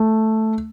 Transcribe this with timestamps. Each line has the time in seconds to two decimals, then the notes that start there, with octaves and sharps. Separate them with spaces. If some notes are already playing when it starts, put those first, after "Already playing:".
Already playing: A3